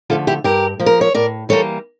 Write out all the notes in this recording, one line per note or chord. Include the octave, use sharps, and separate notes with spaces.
D3 F3 A3 F4 A4
E4 G4
G2 G4 A#4
F3 A#3
A#4
C#5
A2 A#4 D5
E3 G3 A#3 A4 C#5